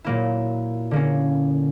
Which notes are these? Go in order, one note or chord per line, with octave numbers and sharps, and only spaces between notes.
A#2 F#3 A#3 E4
D3 A#3 C#4